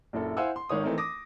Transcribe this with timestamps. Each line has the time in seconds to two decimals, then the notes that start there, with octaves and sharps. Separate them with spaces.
0.13 A#1 F#2 E4 A4
0.37 E4 C5 F5 F#5 G#5 E6
0.56 C6
0.69 G#1 D#3 C#5 D#6
0.83 E3 A3 C4 D#4 A#4
0.98 D6 D#6 A#6